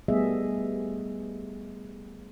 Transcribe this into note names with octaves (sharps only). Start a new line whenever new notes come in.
G3 A3 B3 G#4 D#5 E5